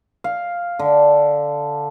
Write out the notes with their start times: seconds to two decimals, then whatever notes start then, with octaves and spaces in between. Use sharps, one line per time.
0.24 F5
0.79 D3